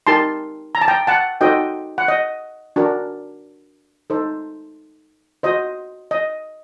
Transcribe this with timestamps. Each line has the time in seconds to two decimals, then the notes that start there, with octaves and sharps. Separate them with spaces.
0.07 D#4 G4 A#4 A5 C6
0.75 A#5
0.81 A5
0.88 G5 A#5
1.07 F#5 A5
1.41 D#4 F#4 A4 C5 D#5 G5
1.98 F#5
2.08 D#5
2.76 D4 F#4 A#4
4.10 D#4 A4 C5
5.43 F#4 C5 D#5
6.11 D#5